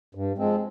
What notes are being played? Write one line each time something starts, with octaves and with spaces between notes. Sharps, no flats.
G2
F3 G#3 C4